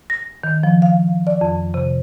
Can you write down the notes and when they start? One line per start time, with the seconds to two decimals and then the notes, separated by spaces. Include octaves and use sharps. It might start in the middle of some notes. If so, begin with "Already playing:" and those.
0.10 A#6
0.44 D#3
0.63 F3
0.82 F5
1.27 D5
1.41 F2
1.74 C3